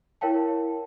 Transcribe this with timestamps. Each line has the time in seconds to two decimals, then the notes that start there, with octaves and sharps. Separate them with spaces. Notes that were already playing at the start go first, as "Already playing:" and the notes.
0.21 E4 A#4 C#5 F5 G5 A5